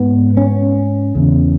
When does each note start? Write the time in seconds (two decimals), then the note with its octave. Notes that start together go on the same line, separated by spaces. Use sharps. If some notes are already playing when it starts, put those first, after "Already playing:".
Already playing: G#2 B3
0.37 C#4
1.15 E2 C#3